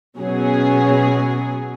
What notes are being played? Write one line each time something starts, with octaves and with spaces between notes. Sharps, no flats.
B2 F#3 C#4 G#4